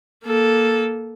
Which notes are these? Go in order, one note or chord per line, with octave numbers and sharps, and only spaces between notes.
A#3 A4